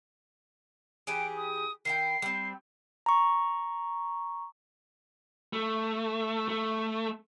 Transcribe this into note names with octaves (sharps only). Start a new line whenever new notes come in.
E3 G4 G#4 D7
D#6
D#3 E4 G5 C7
G3 C4
A#5 C#6
A3
A3